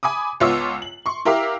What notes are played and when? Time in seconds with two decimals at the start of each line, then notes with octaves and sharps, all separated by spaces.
0.03 G#5 B5 D6 D#6
0.40 C#2 B3 F4 C#5 D6 E6
0.82 F#7
1.06 C6 C#6
1.25 E4 G4 A#4 E5 F5 D6